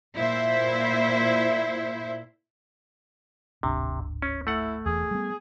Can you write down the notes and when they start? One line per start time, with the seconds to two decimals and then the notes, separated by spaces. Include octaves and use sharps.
0.16 A#2 E4 C5 E5
3.63 D1 G#1 C3 D4
4.22 C#4
4.47 A3 E4 F#5
4.86 E1 E2 G#4
5.11 G3 B3